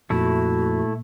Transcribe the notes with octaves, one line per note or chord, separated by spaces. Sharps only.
F2 A#2 A3 E4 F#4